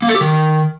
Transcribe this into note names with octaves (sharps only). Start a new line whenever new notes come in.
A#3
A4
G4
D#3